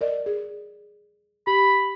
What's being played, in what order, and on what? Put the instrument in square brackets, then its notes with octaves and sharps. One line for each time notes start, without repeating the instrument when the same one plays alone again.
[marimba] A#4 D5 D#5
G#4
[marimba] G4 [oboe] B5